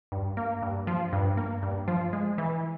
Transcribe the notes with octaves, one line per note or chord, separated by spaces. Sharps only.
G2
A#3
G2
F3
G2
A#3
G2
F3
G#3
E3